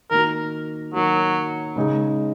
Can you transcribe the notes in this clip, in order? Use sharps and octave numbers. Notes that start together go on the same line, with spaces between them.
D#3 A#3 F#4 A#4
D#3 F#3 A#3 F#4
C#3 G#3 D#4 G#4